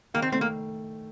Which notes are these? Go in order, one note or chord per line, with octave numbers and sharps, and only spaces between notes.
D#3 A#3
C4
A3 C4
A#3